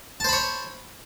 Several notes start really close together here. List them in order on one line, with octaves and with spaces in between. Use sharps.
A5 C5 B5 C#5